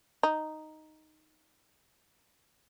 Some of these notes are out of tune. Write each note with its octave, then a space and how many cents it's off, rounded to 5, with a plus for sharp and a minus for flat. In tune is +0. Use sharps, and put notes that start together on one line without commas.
D#4 +0